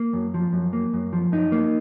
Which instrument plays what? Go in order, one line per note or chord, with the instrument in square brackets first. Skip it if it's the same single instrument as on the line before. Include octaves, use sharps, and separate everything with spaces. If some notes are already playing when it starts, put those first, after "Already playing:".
Already playing: [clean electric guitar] A#3
F#2
F3
F#2
A#3
F#2
F3
F#2 D#4
A#3